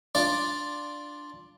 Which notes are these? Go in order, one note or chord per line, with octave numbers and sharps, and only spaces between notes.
D4 F4 D5